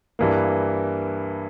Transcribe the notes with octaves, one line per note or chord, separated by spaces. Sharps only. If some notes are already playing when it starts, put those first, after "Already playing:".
G2 E3 A#3